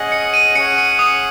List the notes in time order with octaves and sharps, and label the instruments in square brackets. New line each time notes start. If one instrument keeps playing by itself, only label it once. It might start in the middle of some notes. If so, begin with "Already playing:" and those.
Already playing: [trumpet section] C#4 G#4 D#5 F#5
[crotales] C#7
D#7
[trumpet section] C#4 G#4 C#5 F#5 [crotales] C#7
[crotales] C#7
D#6